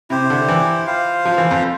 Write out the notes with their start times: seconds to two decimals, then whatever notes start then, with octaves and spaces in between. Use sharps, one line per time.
0.10 C3 E4 G4 C5
0.30 D3
0.48 E3
0.87 F4 C5 F5
1.25 F3
1.38 E3
1.51 F2